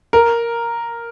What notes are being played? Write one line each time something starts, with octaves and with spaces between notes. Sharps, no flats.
A#4